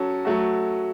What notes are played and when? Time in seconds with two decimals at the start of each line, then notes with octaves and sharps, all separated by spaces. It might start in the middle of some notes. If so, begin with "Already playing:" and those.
Already playing: F#3 C#4 A4
0.25 F#3 A3 F#4